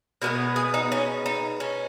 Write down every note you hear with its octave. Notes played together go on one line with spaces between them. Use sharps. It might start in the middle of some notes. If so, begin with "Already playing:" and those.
B2 G#3 B3 A#4
G#4
D#4
C#4
D#4
C#4